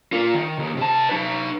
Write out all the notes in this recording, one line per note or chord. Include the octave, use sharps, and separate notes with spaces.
F4 A#4
D#3
D#2
C3 A5
D#4 B4